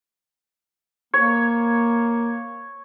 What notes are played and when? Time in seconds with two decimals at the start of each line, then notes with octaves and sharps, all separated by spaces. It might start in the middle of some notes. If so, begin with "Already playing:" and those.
1.14 A#3 C#5